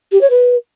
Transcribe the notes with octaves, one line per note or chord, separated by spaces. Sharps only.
G4
C#5
B4